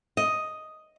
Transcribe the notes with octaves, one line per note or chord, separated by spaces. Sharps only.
D#5